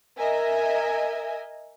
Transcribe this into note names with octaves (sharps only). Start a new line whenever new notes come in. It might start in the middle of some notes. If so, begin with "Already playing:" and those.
A#4 D#5 E5 G#5